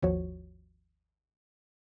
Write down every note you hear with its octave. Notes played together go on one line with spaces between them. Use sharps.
G#1 D#2 F3 F#4 C#5